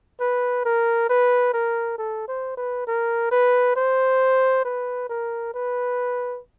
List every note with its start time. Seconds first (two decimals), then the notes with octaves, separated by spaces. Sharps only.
0.20 B4
0.65 A#4
1.09 B4
1.54 A#4
1.98 A4
2.28 C5
2.57 B4
2.87 A#4
3.31 B4
3.76 C5
4.65 B4
5.09 A#4
5.54 B4